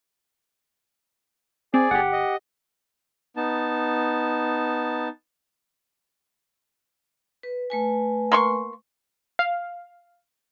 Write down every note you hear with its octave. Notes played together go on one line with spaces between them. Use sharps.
C4 G#4 D5
G1 G4 F#5
D#5
B3 D#4 A5
B4
A3 B4 G#5
A#3 C6 C#6
F5